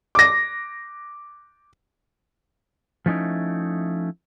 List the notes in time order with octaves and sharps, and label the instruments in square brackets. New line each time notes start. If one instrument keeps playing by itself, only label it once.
[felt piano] D6 A#6
[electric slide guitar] F3 A3 C#4 D#4 E4